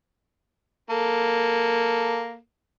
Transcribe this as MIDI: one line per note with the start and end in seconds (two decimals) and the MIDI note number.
0.90 2.37 58
0.90 2.37 69